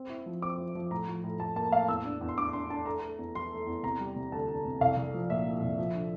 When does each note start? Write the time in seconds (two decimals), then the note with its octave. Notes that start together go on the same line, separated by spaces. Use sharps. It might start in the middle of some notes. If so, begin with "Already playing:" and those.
Already playing: C4
0.10 E4
0.26 F3
0.42 C4 D6
0.58 F3
0.75 F3
0.91 A2 A#5
1.08 F3
1.24 A2
1.40 A2 A5
1.56 A#3 A5
1.72 A2 F5
1.88 E2 E6
2.05 D4
2.21 E2
2.29 C6
2.38 D4 D6
2.53 D4 C6
2.70 D4 A5
2.86 A3 A#5
3.02 A3
3.19 E2
3.35 E3 C6
3.51 A3
3.67 E2
3.83 C3 A#5
3.99 G3
4.16 C3
4.32 D2 A5
4.48 D2
4.64 C3
4.81 C2 F5
4.97 C2
5.14 F3
5.30 A#2 E5
5.46 F3
5.62 C2
5.78 F3
5.94 D3